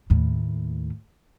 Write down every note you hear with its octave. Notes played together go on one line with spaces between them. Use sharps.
D#2 A2